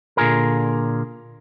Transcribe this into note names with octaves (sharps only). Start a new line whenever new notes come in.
A#2 D3 F4 G#4 A#4